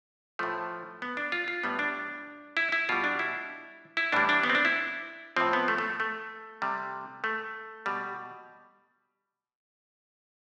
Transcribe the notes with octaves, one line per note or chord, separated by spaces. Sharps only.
A2 F3 A3
B3
D4
F4
F4
A2 G3 B3
D4
E4
E4
B2 G3 F4
D4
E4
E4
A2 E3 G3 D4
D4
B3
C4
D4
E4
A2 F3 C4
B3
A3
A3
A3
C3 G3
A3
B2 G3